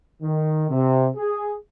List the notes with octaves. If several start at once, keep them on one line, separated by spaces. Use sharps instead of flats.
D#3
C3
G#4